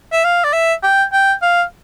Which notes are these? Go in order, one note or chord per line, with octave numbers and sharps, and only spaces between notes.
E5
F5
D5
E5
G5
G5
F5